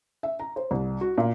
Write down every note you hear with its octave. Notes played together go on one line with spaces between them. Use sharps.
E5
A#5
C5
C2
F#4
A#2